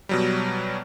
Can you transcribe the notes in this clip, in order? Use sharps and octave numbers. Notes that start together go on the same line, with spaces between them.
B2 F#3 G3